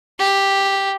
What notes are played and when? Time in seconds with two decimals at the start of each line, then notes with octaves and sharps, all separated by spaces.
0.19 G4